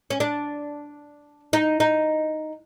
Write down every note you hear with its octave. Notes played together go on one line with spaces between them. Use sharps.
C#4
D4
D#4
D#4